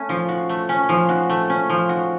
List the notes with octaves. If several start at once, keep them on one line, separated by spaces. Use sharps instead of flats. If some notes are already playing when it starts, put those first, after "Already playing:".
Already playing: A3 C#4
F3
F#4
A3
C#4
F3
F#4
A3
C#4
F3
F#4